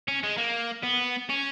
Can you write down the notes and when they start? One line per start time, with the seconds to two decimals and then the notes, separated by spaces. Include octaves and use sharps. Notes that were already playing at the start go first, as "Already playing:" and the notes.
0.08 C#4
0.24 G#3
0.38 A#3
0.83 B3
1.30 C#4